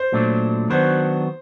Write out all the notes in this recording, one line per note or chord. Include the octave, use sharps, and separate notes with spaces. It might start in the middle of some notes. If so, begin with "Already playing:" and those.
Already playing: C5
A#2 F#3 A3 D4
D#3 F#3 B3 D4 F#4 C5